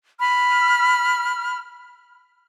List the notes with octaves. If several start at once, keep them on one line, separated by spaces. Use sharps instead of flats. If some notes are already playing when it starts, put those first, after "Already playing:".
B5 F6